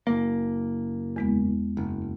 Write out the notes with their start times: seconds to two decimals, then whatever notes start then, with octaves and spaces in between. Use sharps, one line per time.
0.07 F#1 A#3
1.16 E2 G#3 B3
1.77 F#1